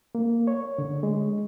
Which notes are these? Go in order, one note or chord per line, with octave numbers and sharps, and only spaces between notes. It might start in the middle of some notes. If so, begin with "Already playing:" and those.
A#3
C#5
D3
G#3